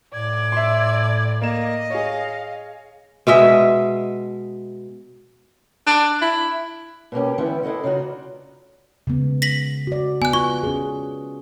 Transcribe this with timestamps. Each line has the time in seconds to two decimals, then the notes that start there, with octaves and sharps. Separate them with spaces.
0.14 A2 D5 G#6
0.52 E5 C6
1.42 A#3 D#5 E7
1.90 G#4 C#5 F5
3.27 B2 G#3 D#5 E5
5.87 D4
6.22 E4
7.12 B2 A#3 C#4 G4
7.38 D3 E3 G3 B3 C#4 E4
7.63 D4 E4 A4 D#5 F#5
7.84 C#3 D#4 F4 F#4
7.99 D4
9.07 C#3 G#3 B3
9.42 A#6 B6 F#7
9.87 F#4 D5
10.22 B3 G#5 F#6
10.33 F4 C#6
10.63 C#4 G#4